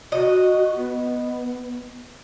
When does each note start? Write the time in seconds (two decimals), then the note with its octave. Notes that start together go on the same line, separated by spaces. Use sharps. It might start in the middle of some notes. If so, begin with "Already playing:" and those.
0.12 F#4 D#5
0.75 B3